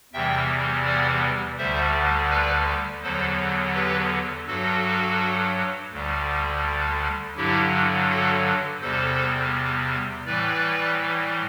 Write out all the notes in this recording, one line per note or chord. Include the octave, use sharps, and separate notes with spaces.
E2 C3 E3 G3 E5 G5
D5 F#5
D2 D3 G3 C5 E5
B4 D5
E2 D3 F#3 A4 C5
G4 B4
G2 F#3 F#4 A4
D2 D3 G3
G2 D3 F#3 E4 G4
F#4 A4
E2 C3 G3 A4 C5
A2 E3 G3 B4 D5